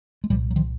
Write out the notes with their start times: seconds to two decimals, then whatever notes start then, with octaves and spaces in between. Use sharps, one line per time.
0.24 G#3
0.30 C2 A#2 F3 G3
0.51 F#3
0.56 D#3 F3